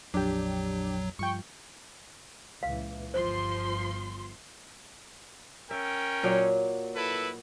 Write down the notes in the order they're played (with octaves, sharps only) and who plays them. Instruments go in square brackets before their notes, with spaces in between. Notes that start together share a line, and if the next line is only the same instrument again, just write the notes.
[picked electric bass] A#1 F2 [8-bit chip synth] F#3 [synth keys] D4 G4
[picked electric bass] G2 F3 [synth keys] G5 C#6
[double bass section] C#2 A#2 E3 [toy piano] F5
[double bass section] G1 G2 [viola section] F3 C6 [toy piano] C5
[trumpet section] C#4 A#4 G5 [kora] E5
[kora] A#2 F#3
[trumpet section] E4 A4 B4